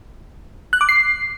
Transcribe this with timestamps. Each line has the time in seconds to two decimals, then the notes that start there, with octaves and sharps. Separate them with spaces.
0.73 F#6
0.81 D6
0.89 C7